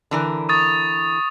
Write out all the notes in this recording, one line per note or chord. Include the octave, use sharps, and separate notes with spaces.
D3 E3 A#4
C#6 D#6 A6